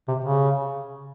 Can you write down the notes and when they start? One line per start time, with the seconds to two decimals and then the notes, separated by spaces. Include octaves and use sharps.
0.08 C3
0.25 C#3